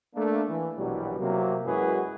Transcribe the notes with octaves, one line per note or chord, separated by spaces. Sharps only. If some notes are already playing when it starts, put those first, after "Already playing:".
A3 A#3 D4
E3
A#1 B2 E3 F#3 G3
C3 F#3 A#3
F#2 G#3 E4 F#4 G#4 B4